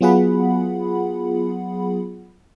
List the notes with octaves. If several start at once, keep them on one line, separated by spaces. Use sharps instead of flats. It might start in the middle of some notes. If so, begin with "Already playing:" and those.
F#3 B3 F4 G#4 F#5 B5